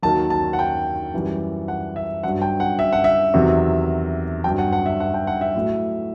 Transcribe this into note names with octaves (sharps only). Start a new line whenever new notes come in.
D#2 D#3 F#3 A5
A5
F#5
G5
F#2 E3 G3
F#5
E5
G2 F#3 F#5
G5
F#5
E5
F#5
E5
E2 C3 D#3 F#3
F#3 G5
G2
F#5
F#5
E5
F#5
G5
F#5
E5
A2 F#3